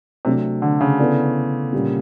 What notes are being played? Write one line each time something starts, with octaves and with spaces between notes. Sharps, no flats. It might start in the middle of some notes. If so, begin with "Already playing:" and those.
C3 F#3 A3 D4 F#4
D3
C#3
B3 E4 A4 D5
A#2 G3 A#3 C#4